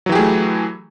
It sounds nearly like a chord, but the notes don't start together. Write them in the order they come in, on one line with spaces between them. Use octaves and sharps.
F#3 E3 G4 G#4 A3